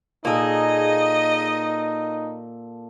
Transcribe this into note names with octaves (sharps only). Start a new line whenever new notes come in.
A#2 A#3 D#4 G#4 A4 D#5